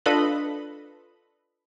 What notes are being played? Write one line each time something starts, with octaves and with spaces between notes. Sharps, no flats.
D4 F4 A4 B4 D#5 B5